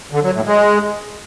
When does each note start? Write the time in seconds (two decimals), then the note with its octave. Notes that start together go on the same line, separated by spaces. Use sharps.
0.12 D3
0.23 F#3
0.34 A2
0.45 G#3